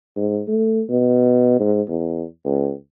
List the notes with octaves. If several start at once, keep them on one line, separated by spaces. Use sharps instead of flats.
G#2
A3
B2
G#2
E2
C#2